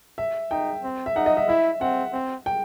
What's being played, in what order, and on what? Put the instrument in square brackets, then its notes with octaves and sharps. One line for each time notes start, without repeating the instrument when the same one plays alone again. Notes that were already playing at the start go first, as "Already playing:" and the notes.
[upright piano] E5
[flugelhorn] D#4 [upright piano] G5
[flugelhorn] C4
[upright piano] E5
[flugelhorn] D#4 [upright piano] F#5
[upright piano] D#5
E5
[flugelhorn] E4 [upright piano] E5
[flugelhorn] C4 [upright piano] F#5
[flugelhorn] C4
[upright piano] G5